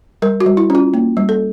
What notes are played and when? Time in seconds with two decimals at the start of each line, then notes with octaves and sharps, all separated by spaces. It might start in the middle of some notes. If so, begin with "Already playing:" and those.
0.22 G3 A#4
0.41 F#4
0.46 G3
0.57 E4
0.70 C#4 F4
0.94 A#3
1.17 G3
1.29 A4